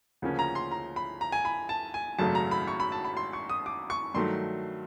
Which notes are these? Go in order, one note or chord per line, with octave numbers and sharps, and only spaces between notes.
D2 C#3 F3 A#3 C#4
A#5
C6
A#5
B5
A#5
G#5
B5
A5
G#5
G#1 F#2 C#3 F#3 A3 A5
A#5
B5
C#6
B5
A5
B5
C6
C#6
D#6
D6
C#6
G2 D#3 F#3 A3 C6